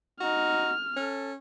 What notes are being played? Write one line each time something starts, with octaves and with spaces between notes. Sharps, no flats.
D#4 F#4 F6
C#4 A4